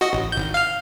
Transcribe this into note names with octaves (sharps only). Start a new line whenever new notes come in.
F#4 D#5
A1
G#1 G6
F5 F6